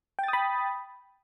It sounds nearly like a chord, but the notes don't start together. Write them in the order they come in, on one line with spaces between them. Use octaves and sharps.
G5 A6 D#6 B5